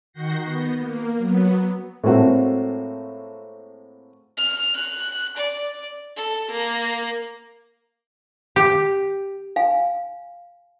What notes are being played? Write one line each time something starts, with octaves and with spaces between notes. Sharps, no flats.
D#3 F#4 F#5 G6 A#6 C7
B3
A#3
F#3 B3
A2 G#3 A#3 C4 F#4 A4
F6
F#6
D5
A4
A#3
G4
F5 G#5